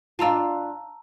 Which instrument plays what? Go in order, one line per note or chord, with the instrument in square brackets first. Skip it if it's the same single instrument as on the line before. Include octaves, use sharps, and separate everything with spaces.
[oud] D4 F4 [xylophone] A5 A#5 E6